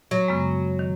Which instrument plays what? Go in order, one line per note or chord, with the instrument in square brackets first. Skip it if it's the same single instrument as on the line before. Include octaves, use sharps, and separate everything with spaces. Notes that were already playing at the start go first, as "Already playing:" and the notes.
[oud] F#3
[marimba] F#2 C#3 G#3 B3
D#3